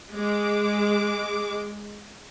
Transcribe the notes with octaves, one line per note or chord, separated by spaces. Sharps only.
G#3 D6